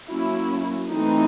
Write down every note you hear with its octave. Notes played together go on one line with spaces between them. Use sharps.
F#3 A#3 C#4 E4
E3 A3 C4 D#4